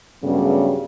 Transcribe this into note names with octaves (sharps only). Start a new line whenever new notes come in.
G2 C#3 F#3 G3 A3 B3